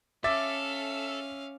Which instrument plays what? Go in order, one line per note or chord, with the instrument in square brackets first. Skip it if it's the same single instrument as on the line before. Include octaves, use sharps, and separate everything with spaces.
[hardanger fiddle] C#4 F5 [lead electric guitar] A4 [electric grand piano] E5 [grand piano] D6 A6